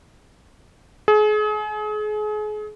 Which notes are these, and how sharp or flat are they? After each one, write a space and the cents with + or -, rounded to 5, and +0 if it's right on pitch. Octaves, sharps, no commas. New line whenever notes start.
G#4 +35